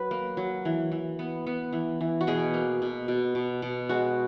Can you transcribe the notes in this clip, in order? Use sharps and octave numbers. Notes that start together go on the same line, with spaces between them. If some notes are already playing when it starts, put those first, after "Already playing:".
Already playing: F#3 B4
A#3
F#3
E3
E3
B3
B3
E3
E3
F#4
B2 G#4
A#3
B2
B2
B2
B2
G#3 F#4